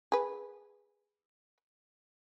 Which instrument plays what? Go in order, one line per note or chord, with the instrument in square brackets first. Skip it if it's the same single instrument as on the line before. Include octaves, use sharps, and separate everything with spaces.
[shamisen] G#4 B4